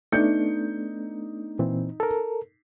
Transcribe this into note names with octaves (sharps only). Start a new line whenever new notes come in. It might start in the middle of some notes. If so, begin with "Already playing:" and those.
A3 B3 D4 D#4 G6 C#7
A#2 E3 C4
A4 A#4